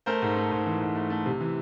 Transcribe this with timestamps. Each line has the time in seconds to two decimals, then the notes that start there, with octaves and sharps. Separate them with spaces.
0.06 A3 A#4 C5
0.22 G#2
0.37 A3
0.51 G#2
0.66 E3
0.81 G#2
0.95 A3
1.10 A3
1.26 C3
1.40 E3